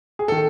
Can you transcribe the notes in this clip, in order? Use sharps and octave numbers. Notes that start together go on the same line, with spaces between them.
G#4
D#3 A4